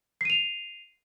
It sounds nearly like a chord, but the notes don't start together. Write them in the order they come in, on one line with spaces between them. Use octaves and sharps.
C7 D#7 F7